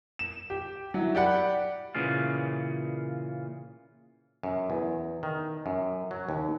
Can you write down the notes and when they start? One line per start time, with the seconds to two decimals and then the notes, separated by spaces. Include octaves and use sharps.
0.19 E7
0.50 G4
0.94 F#3 E4
1.15 G4 D5 F#5 B5
1.95 A#2 C#3 E3 F4
4.43 F#2
4.70 E2
5.23 D#3
5.66 F#2
6.11 F#3
6.29 D#2